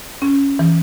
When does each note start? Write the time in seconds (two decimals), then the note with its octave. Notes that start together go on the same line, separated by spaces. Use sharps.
0.22 C#4
0.59 E3